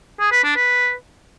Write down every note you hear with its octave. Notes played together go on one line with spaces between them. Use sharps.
G#4
B4
D4
B4